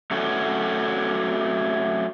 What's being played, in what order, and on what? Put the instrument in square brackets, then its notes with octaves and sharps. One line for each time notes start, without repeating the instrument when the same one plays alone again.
[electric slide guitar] F#3 A3 C#4 F#4